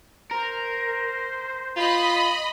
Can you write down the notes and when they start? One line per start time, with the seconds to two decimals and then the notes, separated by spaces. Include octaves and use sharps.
0.31 A#4 C5
1.76 F4 D#5 B5